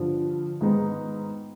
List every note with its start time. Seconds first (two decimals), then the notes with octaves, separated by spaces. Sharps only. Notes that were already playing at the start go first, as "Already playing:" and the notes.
Already playing: G2 D3 F3
0.61 G#2 D#3 G#3 B3 D#4